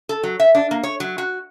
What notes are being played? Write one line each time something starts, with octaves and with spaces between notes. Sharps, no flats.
A4
F#3
E5
D4
A#3
C#5
F#3
F#4